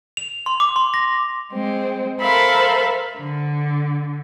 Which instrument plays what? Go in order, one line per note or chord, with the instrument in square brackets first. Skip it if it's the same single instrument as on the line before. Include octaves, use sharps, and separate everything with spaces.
[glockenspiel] F7
C6
D6
C6
A#6
[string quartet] G#3 C4
A4 A#4 C5 E5 F5 B5
D3